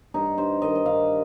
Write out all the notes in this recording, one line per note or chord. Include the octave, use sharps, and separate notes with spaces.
G2 D#4
G2 C5
D#3 D#5
D#5
G2 F5